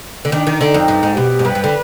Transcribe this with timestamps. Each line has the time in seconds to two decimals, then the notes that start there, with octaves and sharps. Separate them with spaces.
0.25 D3
0.32 D#3 D4
0.47 D#3
0.60 D3 D#4
0.74 F2
0.88 G2
1.03 G#2
1.17 B2 G4
1.39 G#2
1.45 G2 B4
1.55 G2
1.64 D3